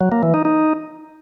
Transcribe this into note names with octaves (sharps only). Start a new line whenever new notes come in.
F#3
A#3
E3
D#4
D#4